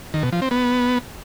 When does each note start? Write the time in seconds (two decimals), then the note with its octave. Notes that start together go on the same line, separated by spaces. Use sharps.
0.14 D#3
0.23 B2
0.33 F3
0.42 C4
0.51 B3